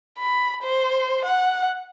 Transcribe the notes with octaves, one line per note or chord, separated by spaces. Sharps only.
B5
C5
F#5